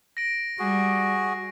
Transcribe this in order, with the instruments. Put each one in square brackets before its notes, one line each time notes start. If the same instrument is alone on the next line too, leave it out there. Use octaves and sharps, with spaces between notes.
[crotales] A#6 D7
[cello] G3 [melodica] F#4 G#4